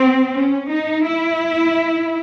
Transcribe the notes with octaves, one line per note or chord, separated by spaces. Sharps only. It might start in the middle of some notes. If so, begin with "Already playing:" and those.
Already playing: C4
C#4
D#4
E4